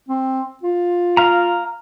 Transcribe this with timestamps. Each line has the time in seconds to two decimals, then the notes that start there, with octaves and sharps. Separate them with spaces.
0.09 C4
0.63 F4
1.17 F5 A#5